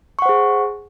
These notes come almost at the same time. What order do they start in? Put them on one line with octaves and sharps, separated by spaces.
C#6 F#5 C5 G#4